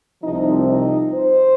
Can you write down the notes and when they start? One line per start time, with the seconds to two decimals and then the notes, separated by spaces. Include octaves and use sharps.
0.22 C2 C3 F3 D#4
0.67 D#4
1.12 C5